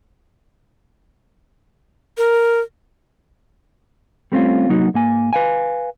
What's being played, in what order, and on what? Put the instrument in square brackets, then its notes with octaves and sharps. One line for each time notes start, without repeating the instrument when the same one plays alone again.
[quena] A#4
[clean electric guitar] G3 A3 C4 C#4 F4
C2 F#3 A#3 D#4 F#4
G#2 A#3 G#5
B4 F5 G#5